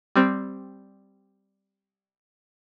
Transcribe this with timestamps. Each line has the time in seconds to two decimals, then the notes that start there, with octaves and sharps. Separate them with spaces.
0.16 G3 C4